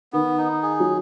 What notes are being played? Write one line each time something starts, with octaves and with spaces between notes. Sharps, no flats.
D#3 B3
D#4
G#4
F#3